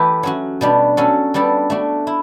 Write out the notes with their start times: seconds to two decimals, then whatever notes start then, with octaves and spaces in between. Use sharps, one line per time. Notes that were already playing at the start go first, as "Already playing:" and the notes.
Already playing: E3 A3 G4 B4
0.23 F#3 C#4 F#4
0.61 B2 G3 D4
0.97 F#3 C#4 F#4 A4
1.34 G3 B3 D4 A4
1.70 A3 D4 F#4
2.07 E4